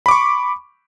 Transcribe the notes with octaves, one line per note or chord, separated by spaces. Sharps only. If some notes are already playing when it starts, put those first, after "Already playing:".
B5 C#6 D6